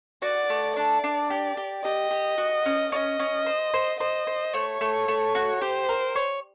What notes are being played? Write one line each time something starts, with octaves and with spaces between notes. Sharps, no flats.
F#4 D5
A3
D4 D5
D4
G4
G4
G4 D#5
G4
F#4
C#4
C#4 D#5
C#4
C5
C5
C5 D#5
C5
A3 C#5
A3
A3
F#4
G4 C5
A#4
C#5